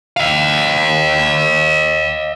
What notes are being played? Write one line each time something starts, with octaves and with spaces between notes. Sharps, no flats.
D#5 F5